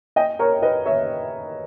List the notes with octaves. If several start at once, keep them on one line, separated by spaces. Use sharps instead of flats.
D#5 G5
A#4 C#5
B4 D#5
C#5 E5